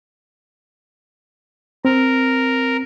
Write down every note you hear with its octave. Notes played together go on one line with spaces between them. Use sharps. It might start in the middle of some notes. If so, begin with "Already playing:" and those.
C4 A#4